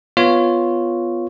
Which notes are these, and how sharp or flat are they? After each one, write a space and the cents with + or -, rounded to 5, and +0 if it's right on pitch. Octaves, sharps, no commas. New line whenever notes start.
B3 +0 F4 +0 C#5 +0